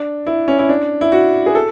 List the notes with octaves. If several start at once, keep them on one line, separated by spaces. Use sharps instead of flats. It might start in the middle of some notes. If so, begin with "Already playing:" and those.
Already playing: D4
E4
C#4
E4
D4
E4
F#4
G#4
A4